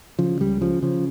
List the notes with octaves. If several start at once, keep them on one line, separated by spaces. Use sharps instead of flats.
C#3 F3
C#2 G3
C#3 F3
C#3 F3